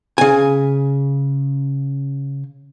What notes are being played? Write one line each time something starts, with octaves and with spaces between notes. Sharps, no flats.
C#3 G#5